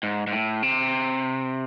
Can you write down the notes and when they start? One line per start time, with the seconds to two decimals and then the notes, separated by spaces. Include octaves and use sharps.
0.03 G#2
0.27 G#2
0.33 A2
0.63 C3